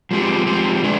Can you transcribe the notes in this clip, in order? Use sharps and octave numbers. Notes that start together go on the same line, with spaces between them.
F3 G#3 C4 G4
F3 G#3 C4 G4
D3 G#3 D4